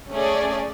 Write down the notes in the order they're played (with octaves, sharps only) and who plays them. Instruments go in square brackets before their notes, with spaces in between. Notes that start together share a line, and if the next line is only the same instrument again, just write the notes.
[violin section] A3 C#4 G#4 D5